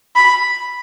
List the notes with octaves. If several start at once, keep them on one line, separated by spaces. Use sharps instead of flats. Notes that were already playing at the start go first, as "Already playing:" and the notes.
B5